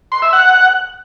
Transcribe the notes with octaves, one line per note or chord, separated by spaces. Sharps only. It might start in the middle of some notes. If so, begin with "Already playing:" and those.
C6
E5
F#5